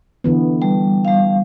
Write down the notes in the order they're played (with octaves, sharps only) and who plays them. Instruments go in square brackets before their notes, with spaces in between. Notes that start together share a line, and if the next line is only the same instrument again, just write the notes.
[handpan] D3 E3 B3
[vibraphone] G3
G3 F5